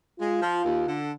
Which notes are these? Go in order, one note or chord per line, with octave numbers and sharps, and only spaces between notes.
G#3 F4
F3
D#2
D3